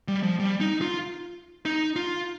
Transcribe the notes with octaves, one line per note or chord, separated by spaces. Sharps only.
G3
F3
G3
D#4
F4
D#4
F4